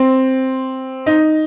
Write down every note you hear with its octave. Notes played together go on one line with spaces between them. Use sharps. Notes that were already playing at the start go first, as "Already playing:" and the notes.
Already playing: C4
D#4